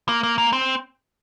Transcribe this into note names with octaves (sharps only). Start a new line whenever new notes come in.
A#3
A#3
A#3
C4